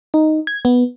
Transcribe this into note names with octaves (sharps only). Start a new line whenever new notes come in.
D#4
G#6
B3